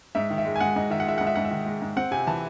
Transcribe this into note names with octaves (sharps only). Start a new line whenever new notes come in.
G#2 E5
D#3
E5
G#3
G#5
G#2 F#5
G#2 D#5
D#3 E5
F#5
G#3 E5
G#2 F#5
E5
G#2 F#5
E5
D#3
G#3
G#2
C4 F#5
C3 G#5
E3 A5